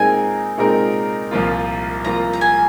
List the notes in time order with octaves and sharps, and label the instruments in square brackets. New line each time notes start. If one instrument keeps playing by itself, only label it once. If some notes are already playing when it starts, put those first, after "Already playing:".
Already playing: [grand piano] A#2 G#3 C4 D#4 A#4 [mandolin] G#5
[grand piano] A#2 G#3 C4 D#4 A#4
C2 A#2 F3 A#3 F4
[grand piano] C2 A#2 F3 A#3 F4 [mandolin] A#5
[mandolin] A#5
G#5